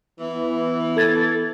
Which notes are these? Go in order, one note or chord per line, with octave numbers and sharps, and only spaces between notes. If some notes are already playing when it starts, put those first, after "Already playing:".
E3 B3
A4 G#6 A6